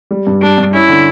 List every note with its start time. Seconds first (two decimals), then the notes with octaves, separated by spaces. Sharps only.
0.11 G3
0.27 G2
0.41 G3 D4
0.58 G2
0.73 C#4 E4
0.89 D3